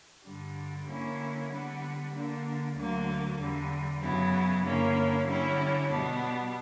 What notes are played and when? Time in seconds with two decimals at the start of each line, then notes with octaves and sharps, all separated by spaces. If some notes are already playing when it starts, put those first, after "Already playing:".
0.24 G2 D3 G3
0.87 D3 A#3 C#4 E4
1.50 D3 G3 B3
2.14 D3 A#3 D4
2.76 D2 D3 F#3 A#3
3.38 E2 D3 G3
4.01 F#2 C#3 F#3 B3 E4
4.64 G2 D3 A#3 C#4 E4
5.26 D3 G3 C#4 E4
5.90 B2 G3 B3 D4